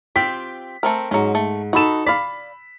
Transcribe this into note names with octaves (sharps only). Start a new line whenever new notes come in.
C4 F4 G4 B6
A3 C4 A#4
G#2 F#3 C#4
A3
D#4 F#4 A4 B5 E7
D5 F5 B5 B6